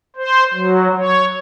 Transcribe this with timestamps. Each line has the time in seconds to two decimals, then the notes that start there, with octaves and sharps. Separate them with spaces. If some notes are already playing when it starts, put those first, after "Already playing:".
0.16 C5
0.53 F#3
0.96 C#5